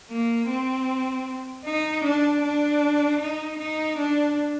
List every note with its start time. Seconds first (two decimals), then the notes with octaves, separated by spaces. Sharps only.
0.10 A#3
0.49 C4
1.65 D#4
2.04 D4
2.43 D4
3.20 D#4
3.59 D#4
3.98 D4